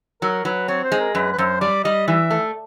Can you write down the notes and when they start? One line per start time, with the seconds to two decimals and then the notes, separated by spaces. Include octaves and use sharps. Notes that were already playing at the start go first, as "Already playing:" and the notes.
0.22 F#3 A#4
0.45 F#3 B4
0.68 C4 C#5
0.84 C5
0.92 G#3
1.00 A#4
1.15 F#2 B4
1.32 B4
1.38 F#2 C5
1.61 G3 D5
1.84 G3 D#5
2.08 E3 E5
2.31 A3